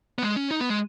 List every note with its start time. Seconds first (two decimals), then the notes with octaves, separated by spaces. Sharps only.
0.18 B3
0.23 G#3
0.36 C#4
0.51 D#4
0.60 B3
0.70 G#3